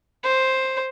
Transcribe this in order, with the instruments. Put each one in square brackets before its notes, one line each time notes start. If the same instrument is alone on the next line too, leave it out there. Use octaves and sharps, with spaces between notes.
[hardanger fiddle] C5